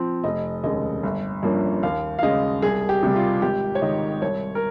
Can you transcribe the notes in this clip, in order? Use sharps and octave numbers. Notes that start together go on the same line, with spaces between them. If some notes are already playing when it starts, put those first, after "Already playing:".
Already playing: F3 C4
F1 D#5
D#2 C#3 G#3 D#5
G1
G2 F3 A#3 C#4
D#2 F5
F5
C#3 G#3 D#5
C2 G#4
G4
C3 G3
F4
G#1 G4
C#5
G#2 D#3 D#5
C2 C#5
A#4